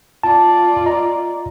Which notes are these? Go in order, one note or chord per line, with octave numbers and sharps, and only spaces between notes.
F4 D5 A5
D#5 A#5